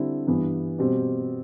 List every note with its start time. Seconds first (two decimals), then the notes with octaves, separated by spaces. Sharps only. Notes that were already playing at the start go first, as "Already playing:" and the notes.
Already playing: D3 G3 C4 E4
0.27 G2 E3 B3
0.79 B2 G3 C4